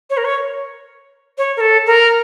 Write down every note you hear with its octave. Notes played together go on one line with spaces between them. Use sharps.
C#5
A#4
C#5
C#5
A#4
A4
A#4